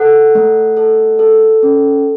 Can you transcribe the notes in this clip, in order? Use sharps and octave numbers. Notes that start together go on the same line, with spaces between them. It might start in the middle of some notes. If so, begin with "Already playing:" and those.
Already playing: A4 F#5
A3
A4
A4
C#4